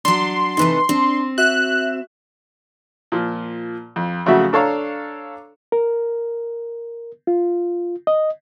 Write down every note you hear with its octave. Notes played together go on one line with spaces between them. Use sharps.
F#3 D4 C6
C3 E3 A3 D#4 B4
C4 D4
F#4 E5 F#6 E7
A#2 F3
F2
F2 C#3 F#3 A3 F#4 E5
D4 A4 C#5 F5 A#5
A#4
F4
D#5